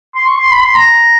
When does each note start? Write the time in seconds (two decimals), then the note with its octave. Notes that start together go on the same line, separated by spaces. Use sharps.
0.15 C6
0.27 C#6
0.39 C6
0.51 B5
0.63 C6
0.75 A#5